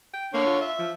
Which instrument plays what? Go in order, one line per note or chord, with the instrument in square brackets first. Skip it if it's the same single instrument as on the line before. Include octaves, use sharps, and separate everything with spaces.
[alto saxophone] G5
[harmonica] D3 C#5 [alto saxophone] A#3
[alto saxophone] F4
[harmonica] E5
[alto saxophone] F3